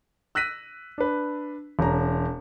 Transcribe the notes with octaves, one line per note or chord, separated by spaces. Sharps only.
E6 F#6 A#6 B6 D#7
D4 B4
E1 C#4 A#5